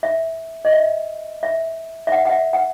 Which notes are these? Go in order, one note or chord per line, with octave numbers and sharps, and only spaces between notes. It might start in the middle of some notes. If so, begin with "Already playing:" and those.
E5
D#5
E5
E5
E5
F#5
F#5
E5
F#5